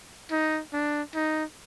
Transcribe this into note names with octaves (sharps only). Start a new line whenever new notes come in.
D#4
D4
D#4